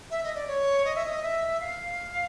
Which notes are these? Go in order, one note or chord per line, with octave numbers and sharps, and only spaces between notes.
E5
D#5
D5
C#5
D#5
E5
D#5
E5
F5